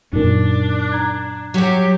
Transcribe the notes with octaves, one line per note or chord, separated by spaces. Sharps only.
F#2 A#2 D4 D#4 A#4
A#5 G#6
F#3 F#4 G4